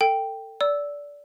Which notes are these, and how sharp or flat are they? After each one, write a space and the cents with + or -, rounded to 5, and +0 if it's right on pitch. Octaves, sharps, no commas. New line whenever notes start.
A4 +30 G5 +0
D5 -20 E6 +0